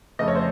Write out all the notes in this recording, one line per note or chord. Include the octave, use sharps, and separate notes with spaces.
F2 C#3 A3 D#5
C#5
C5